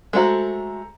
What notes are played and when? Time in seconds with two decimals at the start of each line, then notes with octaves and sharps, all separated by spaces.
0.13 G#3 A3 F#4 A4 C5 A#5